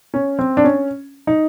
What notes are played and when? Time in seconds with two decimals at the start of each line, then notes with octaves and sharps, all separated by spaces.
0.14 C#4
0.39 C4
0.57 D4
0.64 C#4
1.27 D#4